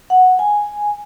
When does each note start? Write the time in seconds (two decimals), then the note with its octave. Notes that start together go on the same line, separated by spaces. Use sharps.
0.10 F#5
0.39 G#5